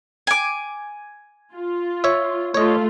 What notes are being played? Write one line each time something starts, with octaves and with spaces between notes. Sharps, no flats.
G#5 D6
F4
C#5 E5
A3 F4 C#5 D#5